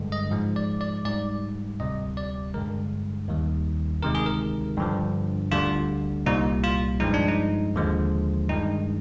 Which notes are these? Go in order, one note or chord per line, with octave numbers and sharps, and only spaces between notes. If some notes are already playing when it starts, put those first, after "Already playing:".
Already playing: G2 D3 G#3
D#5
G#2 F3 G#3
D5
D5
G#2 G3 D5
D2 C3 G3 D#5
D5
G2 D3 G#3 A#4
D#2 D#3 G3
D2 C3 D#3 G#3 A#4
G#4
A#4
G2 D3 F3
D2 D3 G3 F4
C2 A#2 G3 D#4
F4
G2 F3 G#3 D#4
D4
D#4
D#2 D3 F3 G#3
G2 D#3 G#3 D#4